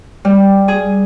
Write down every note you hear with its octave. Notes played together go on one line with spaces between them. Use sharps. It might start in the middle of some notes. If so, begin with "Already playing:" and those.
G3
G#4